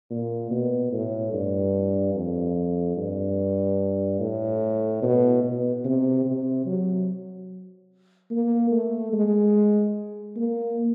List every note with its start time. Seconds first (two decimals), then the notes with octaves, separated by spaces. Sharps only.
0.10 A#2
0.51 B2
0.92 A2
1.33 G2
2.15 F2
2.97 G2
4.20 A2
5.02 B2
5.44 B2
5.85 C3
6.25 C3
6.66 F#3
8.30 A#3
8.71 A3
9.13 G#3
10.37 A#3